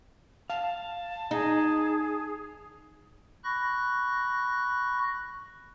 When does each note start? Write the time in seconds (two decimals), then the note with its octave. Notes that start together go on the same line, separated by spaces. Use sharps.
0.50 F5 A5
1.31 D#4 G#4
3.44 B5 C#6 F#6 A#6